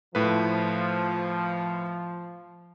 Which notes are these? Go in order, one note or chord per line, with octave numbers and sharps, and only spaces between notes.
A2 F3 B4